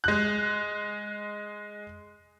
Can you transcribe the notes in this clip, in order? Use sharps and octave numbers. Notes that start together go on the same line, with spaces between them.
G#3 F#6